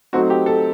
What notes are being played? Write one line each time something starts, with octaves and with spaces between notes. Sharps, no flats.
F#3 A3 C4 D#4 F#4
G4
A4